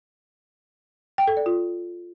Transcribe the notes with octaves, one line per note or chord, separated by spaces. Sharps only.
G5
A4
D5
F4